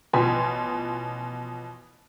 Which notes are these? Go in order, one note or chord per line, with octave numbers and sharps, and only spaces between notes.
A1 B2 F3 G#5 C6 B6